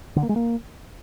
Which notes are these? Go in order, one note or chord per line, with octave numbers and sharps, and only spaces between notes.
D3
A#3
G#3
A#3